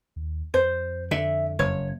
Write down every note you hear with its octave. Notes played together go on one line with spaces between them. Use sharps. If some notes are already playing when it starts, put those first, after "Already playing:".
D#2
F2 C5
D3 E5
F#1 C#5